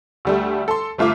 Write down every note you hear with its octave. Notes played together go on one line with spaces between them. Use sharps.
D2 G3 A3
A4 C6
G1 A3 F4 E5 D6